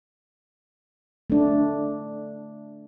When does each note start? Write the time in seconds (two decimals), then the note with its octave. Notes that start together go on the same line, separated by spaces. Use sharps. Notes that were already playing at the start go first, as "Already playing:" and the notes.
1.30 A3 D4